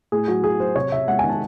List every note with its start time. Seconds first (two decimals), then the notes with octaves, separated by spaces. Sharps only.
0.12 A2 G#4
0.28 F#3 F#4
0.43 A2 G#4
0.60 F#3 C5
0.75 C3 C#5
0.92 C3 E5
1.08 G#3 F#5
1.19 G#5
1.24 D#3
1.29 A5